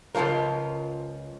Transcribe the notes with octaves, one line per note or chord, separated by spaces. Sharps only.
C#2 G#2 F3 F4 A#4